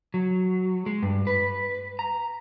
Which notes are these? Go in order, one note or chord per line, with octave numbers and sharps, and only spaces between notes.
F#3
G#3
G2
B4
A#5